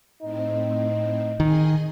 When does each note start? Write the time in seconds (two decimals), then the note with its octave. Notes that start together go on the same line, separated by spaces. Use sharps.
0.22 A2 C4 D#4
1.40 D#3 G#4 D#5 G#5